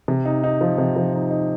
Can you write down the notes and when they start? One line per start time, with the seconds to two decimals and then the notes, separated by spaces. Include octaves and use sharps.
0.08 C3
0.25 D#4
0.44 D#4
0.61 F3
0.78 C3
0.96 F3
1.14 D#4
1.31 D#4